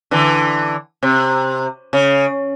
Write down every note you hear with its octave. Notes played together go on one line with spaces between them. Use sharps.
D3 E3
C3
C#3